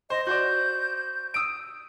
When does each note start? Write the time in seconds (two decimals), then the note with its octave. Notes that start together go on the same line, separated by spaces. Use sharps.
0.10 C5 D#5
0.27 F#4 C5 D5 G6
1.34 D#6 E6 D7